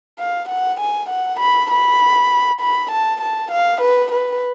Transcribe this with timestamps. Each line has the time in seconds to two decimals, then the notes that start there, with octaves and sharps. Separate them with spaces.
0.19 F5
0.49 F#5
0.80 G#5
1.09 F#5
1.40 B5
1.71 B5
2.61 B5
2.92 A5
3.22 A5
3.52 F5
3.81 B4
4.12 B4